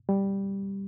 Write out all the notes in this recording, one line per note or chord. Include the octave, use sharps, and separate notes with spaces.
G3